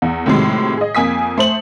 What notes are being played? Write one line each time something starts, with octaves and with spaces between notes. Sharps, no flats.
E2
A2 C3 D#3 F#3 G#3
G#4 D#5
F2 A#3 G#5 D#6 B6
A3 C5 F#7